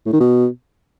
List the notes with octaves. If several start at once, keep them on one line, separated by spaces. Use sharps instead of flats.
A2
D#3
B2